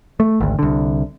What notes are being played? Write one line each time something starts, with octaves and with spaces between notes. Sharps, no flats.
A3
G#1 D2
C2 D3